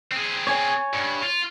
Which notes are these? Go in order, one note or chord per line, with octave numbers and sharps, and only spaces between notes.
C4 G#4
C#5 G#5
G2
F4